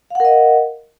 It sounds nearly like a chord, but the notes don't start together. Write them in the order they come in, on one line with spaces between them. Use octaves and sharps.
F5 F#5 A#4 D#5